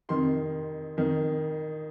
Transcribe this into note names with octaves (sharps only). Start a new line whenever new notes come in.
F2 C3 D#3 C6
F2 D#3